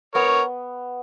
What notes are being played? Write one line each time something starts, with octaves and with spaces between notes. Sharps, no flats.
B3 A#4 C#5